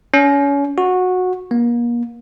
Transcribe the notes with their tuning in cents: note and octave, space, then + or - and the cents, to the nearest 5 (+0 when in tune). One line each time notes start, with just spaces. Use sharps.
C#4 +30
F#4 -15
A#3 +35